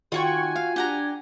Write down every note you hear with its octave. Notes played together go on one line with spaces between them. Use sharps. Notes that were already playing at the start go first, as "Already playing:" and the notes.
D#3 F4 F#4 G5 C#6 G#6
G#5
F5
D4 G4 F#5 A#5